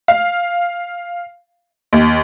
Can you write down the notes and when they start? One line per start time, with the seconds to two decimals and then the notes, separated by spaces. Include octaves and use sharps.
0.08 F5
1.93 D#2